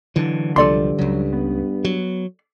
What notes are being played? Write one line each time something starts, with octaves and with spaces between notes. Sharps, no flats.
D3 E3 F#3 D4
C2 G2 F3 A4 D5 C6
C#2 C#3 F#3
B3
F#3